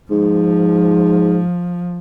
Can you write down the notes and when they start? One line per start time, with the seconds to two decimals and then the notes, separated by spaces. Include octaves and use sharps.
0.11 G#2 F3